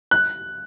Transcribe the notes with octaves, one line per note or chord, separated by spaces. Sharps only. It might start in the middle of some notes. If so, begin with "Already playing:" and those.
F#6